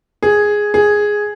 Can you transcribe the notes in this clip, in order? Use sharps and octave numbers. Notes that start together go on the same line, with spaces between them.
G#4
G#4